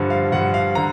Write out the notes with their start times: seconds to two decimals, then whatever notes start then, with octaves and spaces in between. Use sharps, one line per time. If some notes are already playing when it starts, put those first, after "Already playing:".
Already playing: G2 D3 F3
0.10 F5
0.32 G2 D3 F3 F#5
0.54 F5
0.75 D3 A#5